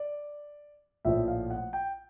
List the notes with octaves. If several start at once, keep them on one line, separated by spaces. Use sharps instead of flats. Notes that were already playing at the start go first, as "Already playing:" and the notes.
Already playing: D5
A#1 A2 F3 E5
F5
F#5
G5